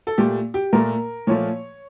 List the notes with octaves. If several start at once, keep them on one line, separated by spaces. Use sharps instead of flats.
A4
A#2 A3 G4
G4
A#2 A3 A#4
A#2 F3 A3 C#5